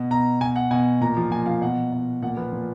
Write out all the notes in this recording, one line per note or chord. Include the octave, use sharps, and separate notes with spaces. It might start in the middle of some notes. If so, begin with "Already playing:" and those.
Already playing: B2
B2 A#5
B2 G#5
F#5
B2 G#5
A#2 A#5
F3
A#2 G#5
F3 F5
B2 F#5
B2
A#2 F#5
F3 B4
A#2